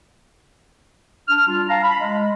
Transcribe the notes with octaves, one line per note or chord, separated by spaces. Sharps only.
D4 F6
G3 F4
F5 A5 A#5
B5
G#3